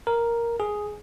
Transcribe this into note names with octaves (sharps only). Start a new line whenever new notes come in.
A#4
G#4